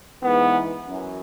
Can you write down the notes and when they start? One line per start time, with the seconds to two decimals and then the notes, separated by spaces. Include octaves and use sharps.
0.24 G#2 E3 B3
0.84 F#2 E3